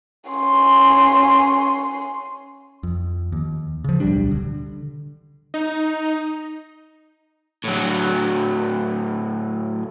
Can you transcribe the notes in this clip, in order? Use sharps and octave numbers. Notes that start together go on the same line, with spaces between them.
C#4 C6
F2
D#2
C#3 F3
D1 B1 G3 D4
D3
D#4
A2 F#3